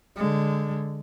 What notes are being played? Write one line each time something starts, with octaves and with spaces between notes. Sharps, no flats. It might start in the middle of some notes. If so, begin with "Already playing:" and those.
D3 G#3